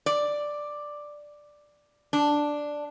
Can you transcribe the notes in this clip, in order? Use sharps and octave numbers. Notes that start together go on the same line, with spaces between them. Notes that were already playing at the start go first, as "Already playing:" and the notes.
D5
D4